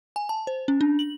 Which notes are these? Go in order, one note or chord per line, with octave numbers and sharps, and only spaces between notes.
G#5
A5
C5
C#4
D4
F#7